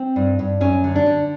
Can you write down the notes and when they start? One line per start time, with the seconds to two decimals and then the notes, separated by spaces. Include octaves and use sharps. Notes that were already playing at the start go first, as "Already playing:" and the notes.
Already playing: C4
0.16 G2
0.39 G2
0.61 F#2 C#4
0.84 D3
0.95 D4
1.06 D3